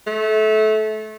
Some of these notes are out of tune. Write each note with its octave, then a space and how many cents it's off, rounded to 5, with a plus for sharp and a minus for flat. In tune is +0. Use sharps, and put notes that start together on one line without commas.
A3 -25